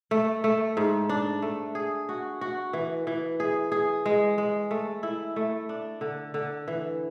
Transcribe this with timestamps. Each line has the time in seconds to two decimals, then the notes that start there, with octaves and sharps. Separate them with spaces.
0.11 A3
0.44 A3
0.77 G#2
1.09 D4
1.42 A3
1.75 G#4
2.09 F#4
2.41 F#4
2.73 E3
3.07 E3
3.40 G#4
3.72 G#4
4.06 G#3
4.38 G#3
4.71 A3
5.03 E4
5.36 A3
5.69 D4
6.01 D3
6.34 D3
6.68 E3